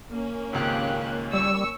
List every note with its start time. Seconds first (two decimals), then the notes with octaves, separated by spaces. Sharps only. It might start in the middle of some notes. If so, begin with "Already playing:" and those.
0.11 A#3 C#4
0.53 G#1 C#2 G4 F5 F#6
1.33 G3 C#6 E6